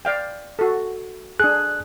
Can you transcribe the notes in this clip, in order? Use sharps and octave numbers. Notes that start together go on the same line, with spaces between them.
D5 F5 G5
F#4 A4
D4 G#4 F#6